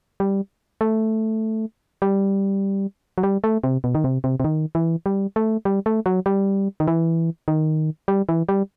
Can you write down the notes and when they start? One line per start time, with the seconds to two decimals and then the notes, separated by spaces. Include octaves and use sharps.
0.20 G3
0.81 A3
2.02 G3
3.18 F#3
3.23 G3
3.44 A3
3.64 C3
3.84 B2
3.95 D#3
4.04 C3
4.24 C3
4.40 C3
4.45 D#3
4.75 E3
5.06 G3
5.36 A3
5.65 G3
5.86 A3
6.06 F#3
6.26 G3
6.80 D#3
6.88 E3
7.48 D#3
8.08 G3
8.29 E3
8.49 G3